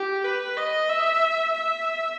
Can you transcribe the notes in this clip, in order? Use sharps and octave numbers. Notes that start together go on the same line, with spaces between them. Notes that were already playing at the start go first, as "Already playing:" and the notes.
Already playing: G4
B4
D#5
E5
E5